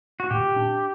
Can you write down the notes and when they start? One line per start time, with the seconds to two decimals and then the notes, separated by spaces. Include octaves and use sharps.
0.20 F#4
0.31 A#2 G4
0.56 D4